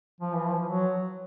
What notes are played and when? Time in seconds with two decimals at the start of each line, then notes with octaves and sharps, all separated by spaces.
0.21 F3
0.34 E3
0.46 F3
0.66 F#3